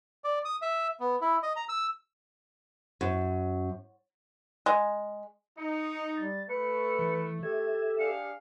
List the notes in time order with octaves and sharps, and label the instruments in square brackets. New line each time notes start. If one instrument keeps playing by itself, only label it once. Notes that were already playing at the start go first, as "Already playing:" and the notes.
[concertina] D5
D#6
E5
B3
E4
D#5
A#5
E6
[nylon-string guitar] F#2
[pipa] G#3
[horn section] D#4 [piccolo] C#7
[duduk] G3 [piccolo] A6
[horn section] A3 [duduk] B4 [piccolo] C#7
[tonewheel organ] E3
[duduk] G4 [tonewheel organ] A4 E5 [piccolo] G#6
[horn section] D4 G#4 F5 [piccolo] C#7